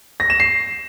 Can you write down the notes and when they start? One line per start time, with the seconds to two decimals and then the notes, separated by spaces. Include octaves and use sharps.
0.20 A#6
0.30 E7
0.40 C7